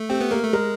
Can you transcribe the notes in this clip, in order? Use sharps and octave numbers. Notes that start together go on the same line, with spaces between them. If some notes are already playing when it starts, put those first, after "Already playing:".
Already playing: A3
C4 G4
B3
A#3 A#4
A3
G#3 A#4